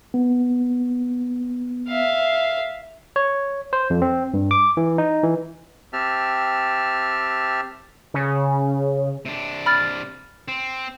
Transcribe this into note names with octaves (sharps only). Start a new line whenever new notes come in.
B3
E5 F5
C#5
C5
F2
C4
G2
D6
E3
D#4
E3
C4 G4 E5 A5 F6
C#3
C3 D4
B5 F6 A6
C4